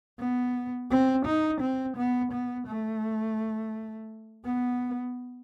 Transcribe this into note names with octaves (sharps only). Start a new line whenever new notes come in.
B3
C4
D#4
C4
B3
B3
A3
B3